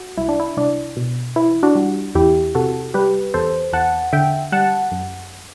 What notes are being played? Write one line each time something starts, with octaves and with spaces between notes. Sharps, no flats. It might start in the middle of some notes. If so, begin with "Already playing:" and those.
Already playing: F#4
C2 E4
D4
E4
C2 D4
B2
E3 E4
D4 F#4
G3
E2 E4 G4
C3 F#4 A4
G3 G4 B4
E2 A4 C5
E2 F#5 A5
D3 E5 G5
G3 F#5 A5
F#2